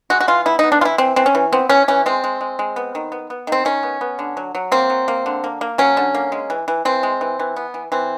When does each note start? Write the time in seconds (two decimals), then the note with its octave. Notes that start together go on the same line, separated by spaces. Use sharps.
0.10 G#3 F#4
0.21 F#4
0.28 E3 F4
0.46 B3 E4
0.59 D#4
0.63 B3
0.72 D4
0.81 E3 F4
0.85 E4
0.98 E3 C4
1.16 E3 C4
1.26 C#4
1.35 E3
1.52 B3 C4
1.69 E3 C#4
1.88 E3 C#4
2.06 G#3 C4
2.24 G#3
2.41 G#3
2.59 G#3
2.76 B3
2.95 D#3
3.12 B3
3.30 B3
3.47 D#3 C4
3.65 D#3 C#4
3.83 B3
4.01 B3
4.19 D3
4.37 F#3
4.55 F#3
4.72 A#3 C4
4.90 F#3
5.08 A#3
5.26 D3
5.44 A#3
5.61 A#3
5.78 F#3 C#4
5.97 D3
6.14 A#3
6.32 G#3
6.50 E3
6.68 E3
6.85 E3 C4
7.03 G#3
7.21 E3
7.39 E3
7.56 B3
7.74 E3
7.92 E3 C4